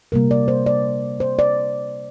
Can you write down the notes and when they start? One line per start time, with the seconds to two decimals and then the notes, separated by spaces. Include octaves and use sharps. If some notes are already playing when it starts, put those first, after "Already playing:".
0.12 C3 G3 A#3 A#4
0.31 D5
0.48 C5
0.66 D5
1.20 C5
1.39 D5